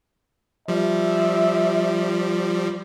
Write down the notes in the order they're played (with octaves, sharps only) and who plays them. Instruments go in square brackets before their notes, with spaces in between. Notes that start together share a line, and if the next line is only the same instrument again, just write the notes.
[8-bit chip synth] F3 G3 [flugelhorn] E5